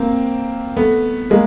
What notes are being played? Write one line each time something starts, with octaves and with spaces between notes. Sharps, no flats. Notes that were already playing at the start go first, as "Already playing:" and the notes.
Already playing: A#3 C4
A3 B3
G#3 A#3